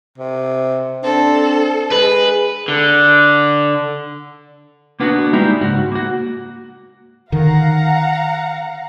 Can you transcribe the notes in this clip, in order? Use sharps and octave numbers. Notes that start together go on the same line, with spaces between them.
C3
C4 D4 A4
G#3 G#4 B4
D3
A#3 B3 D4 F4 F#4
G3 G#3 D#4 E4 G4
C#2 G#2 F#4
A#3 F#4
D3 D#3 F5 F#5 A#5